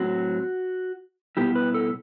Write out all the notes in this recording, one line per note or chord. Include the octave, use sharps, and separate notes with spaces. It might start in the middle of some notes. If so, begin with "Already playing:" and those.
Already playing: A2 F#3 C4 F#4
B2 G3 B3 E4 G4
B4
A4